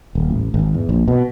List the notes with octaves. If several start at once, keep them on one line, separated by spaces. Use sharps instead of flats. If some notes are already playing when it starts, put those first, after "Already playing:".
D#1
A1
G#1
E2
A#1
B2